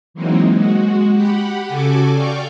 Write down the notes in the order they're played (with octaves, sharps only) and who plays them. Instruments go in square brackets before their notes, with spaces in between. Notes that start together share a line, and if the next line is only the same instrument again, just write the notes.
[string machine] E3 F#3 G#3 A#3 C4 D#4
G#3 F#4
G4 F#5 B5
C#3 F#4 A4 G#5 D6
D5 F5 G5 C#6 D6